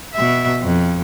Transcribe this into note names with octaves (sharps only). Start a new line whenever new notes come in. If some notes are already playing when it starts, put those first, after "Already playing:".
B2 E5
F2